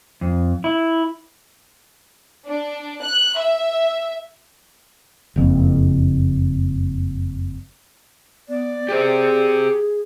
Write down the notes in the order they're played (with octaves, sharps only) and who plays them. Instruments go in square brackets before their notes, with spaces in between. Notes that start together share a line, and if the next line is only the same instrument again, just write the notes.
[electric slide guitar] F2
E4
[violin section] D4
F#6
E5
[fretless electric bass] F#1 F2
[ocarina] B3 [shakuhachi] D5
[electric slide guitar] G4 C5 [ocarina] G#4